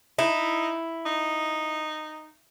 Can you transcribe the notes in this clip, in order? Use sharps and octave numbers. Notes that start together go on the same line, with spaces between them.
D#4 E4
D#4